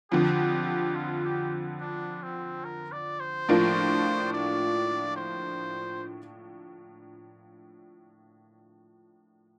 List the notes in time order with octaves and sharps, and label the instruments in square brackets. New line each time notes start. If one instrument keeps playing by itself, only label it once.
[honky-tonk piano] F2 D3 F3 [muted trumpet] G4
[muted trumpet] F4
G4
D4
C4
A#4
D5
C5
[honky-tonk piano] A2 F3 A#3 D4 F4
[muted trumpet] D5
C5